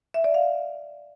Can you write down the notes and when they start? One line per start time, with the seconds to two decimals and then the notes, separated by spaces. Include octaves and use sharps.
0.14 E5
0.24 D5
0.34 F5